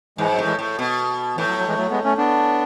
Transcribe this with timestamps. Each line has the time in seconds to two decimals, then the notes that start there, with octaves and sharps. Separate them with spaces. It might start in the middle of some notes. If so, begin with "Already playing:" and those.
0.18 G#2 E3 G#3
0.32 F#3
0.38 A2
0.44 E3 G#3
0.59 A2
0.79 B2
1.37 A2 E3
1.48 F#3
1.58 F#3
1.68 E3 G#3
1.77 F#3 A3
1.90 G#3 B3
2.04 A3 C#4
2.17 B3 D4